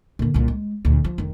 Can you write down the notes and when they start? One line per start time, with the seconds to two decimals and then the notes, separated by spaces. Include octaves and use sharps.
0.19 A#2 D3
0.34 C2 A#2
0.48 G#3
0.85 D2 A#2
1.04 F3
1.18 F1 D#3